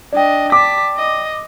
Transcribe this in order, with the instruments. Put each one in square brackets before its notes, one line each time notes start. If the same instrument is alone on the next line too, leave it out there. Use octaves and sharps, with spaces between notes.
[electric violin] D4 D#5 [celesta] D5 G5
[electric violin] A5 B6 [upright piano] D6
[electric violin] D#5